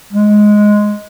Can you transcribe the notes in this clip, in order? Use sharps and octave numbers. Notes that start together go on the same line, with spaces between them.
G#3